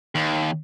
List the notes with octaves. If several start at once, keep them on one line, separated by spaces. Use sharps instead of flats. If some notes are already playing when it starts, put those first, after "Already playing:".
D#2